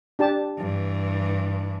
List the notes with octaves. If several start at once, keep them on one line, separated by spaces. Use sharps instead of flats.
D4 G4 A5
G2 E3